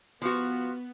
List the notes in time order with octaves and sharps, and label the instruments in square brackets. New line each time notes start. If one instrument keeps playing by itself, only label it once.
[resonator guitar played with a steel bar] F3 F#4 [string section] B3